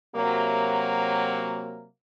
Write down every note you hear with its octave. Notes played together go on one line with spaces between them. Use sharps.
C3 F#3 A#3